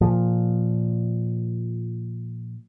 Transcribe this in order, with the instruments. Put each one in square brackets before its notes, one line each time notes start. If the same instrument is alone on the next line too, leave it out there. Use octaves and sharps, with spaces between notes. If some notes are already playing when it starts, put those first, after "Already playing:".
[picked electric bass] A#2 F3